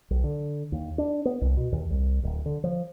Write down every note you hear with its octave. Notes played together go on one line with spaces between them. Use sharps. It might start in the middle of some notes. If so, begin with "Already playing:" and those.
B1
D3
D#2
D4
B3
C2
B2
D#2
C2
D1
D3
F3